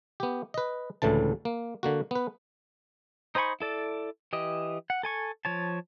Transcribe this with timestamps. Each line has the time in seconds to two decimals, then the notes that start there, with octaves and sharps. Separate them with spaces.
0.20 B3 G4
0.54 B4 D#5
1.02 C#2 A2 D3 E3 A5
1.45 A#3
1.83 D3 A#3 F#4
2.11 B3 B4
3.35 D#4 C5 G#5 B5 C#6
3.60 E4 A4 D5
4.33 E3 G4 D#5
4.90 F#5
5.03 A4 G#5 C#6
5.45 F3 C#5 A5